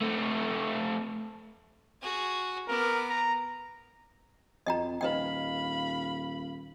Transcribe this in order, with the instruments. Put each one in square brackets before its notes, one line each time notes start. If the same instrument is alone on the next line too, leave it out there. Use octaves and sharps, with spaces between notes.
[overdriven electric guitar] A3 C4
[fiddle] F#4 G#4
[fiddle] B3 D6 [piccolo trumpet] A#4
[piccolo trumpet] A#5
[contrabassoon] F2 [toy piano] D#5 G5 A#5
[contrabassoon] D#1 [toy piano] B4 D#5 G5 [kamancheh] F5 B5